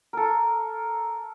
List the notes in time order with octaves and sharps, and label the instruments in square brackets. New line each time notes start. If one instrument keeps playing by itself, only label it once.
[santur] A4 A#4